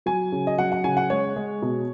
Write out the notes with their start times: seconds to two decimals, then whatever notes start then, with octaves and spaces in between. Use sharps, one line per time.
0.06 F#3 G#5
0.32 C#3
0.47 D#5
0.58 F#3 F#5
0.72 F#5
0.84 C#3 G#5
0.97 F#5
1.10 G#3 C#5
1.36 G#3
1.62 B2